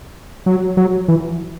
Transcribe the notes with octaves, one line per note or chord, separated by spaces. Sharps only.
F#3
F#3
E3